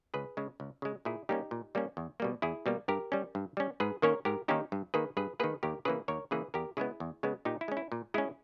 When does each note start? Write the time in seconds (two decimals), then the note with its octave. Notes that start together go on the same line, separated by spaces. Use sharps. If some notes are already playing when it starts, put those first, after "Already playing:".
0.14 C#2 G#4 B4
0.37 C#3 G#3
0.60 C#2
0.82 C#3 G#3
1.05 A#2 E4 G#4
1.29 G3 A#3 C#4 D#4 G4
1.51 A#2
1.75 G3 A#3 C#4
1.97 E2
2.20 B2 G3 A#3
2.42 E2 E4 G#4
2.66 B2 G3 A#3
2.88 G2 G4 A#4
3.12 G3 C#4
3.35 G2
3.57 G3 C#4
3.80 G#2 G#4 B4
4.02 D#3 A#3 C#4 A#4 C#5
4.25 G#2 G4 A#4
4.48 D#3 A#3 C#4 D#4 G4
4.72 G2
4.94 D#3 A#3 G#4 B4
5.17 G2 G#4 B4
5.40 D#3 A#3 G#4 B4
5.63 D#2 G4 A#4
5.85 C#3 E3 A#3 G#4 B4
6.08 D#2 A#4 C#5
6.31 C#3 E3 A#3 G#4 B4
6.54 E2 G4 A#4
6.77 C#3 G#3 B3 E4 G#4
7.00 E2
7.23 C#3 G#3 B3
7.45 A#2 D#4 G4
7.61 E4
7.68 G#3 C#4
7.77 E4
7.92 A#2
8.14 G#3 C#4 E4 G#4